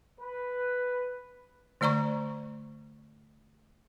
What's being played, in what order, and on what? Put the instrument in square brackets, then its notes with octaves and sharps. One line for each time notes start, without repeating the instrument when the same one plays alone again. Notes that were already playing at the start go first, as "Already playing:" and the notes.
[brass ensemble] B4
[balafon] D3 A3 D5 A#5 C#6